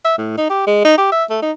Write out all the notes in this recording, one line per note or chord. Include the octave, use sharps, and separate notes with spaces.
E5
A2
D#4
G4
G#3
D#4
G4
E5
A3
D#4